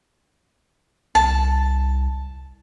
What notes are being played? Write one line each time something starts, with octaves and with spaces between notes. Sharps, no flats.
C2 A5